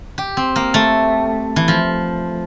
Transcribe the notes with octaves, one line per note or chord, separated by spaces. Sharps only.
G4
C4
A#3
A3
E3
F3